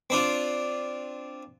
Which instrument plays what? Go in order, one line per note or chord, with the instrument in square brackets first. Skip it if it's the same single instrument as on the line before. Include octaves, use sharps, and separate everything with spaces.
[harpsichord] C4 D4 F4